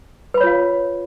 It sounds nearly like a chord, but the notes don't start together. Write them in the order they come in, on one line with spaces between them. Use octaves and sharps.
B4 B5 C#5 F4 F5